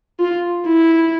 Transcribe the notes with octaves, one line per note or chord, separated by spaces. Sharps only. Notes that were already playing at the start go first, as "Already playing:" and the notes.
F4
E4